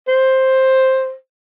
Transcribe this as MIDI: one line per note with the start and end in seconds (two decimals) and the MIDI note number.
0.08 1.14 72